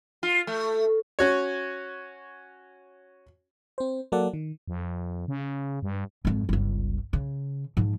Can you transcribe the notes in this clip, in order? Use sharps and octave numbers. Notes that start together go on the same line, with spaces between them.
F4
A3
C#4 F#4 C#5
C4 C5
F#3 A#3 A4 D5 F#5
D#3
F2
C#3
G2
G#1 F2
G1 C#2
C#3
G#2 F3